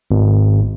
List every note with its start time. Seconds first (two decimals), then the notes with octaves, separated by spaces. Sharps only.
0.11 G#1